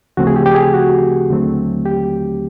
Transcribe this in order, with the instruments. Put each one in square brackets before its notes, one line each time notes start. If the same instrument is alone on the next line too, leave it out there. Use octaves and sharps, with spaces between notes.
[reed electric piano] D2 C#3 F3 A3 C4 F#4
G#4
G4
G4
G#4
F#4
D#2 D3 F#3 A3 C4
G4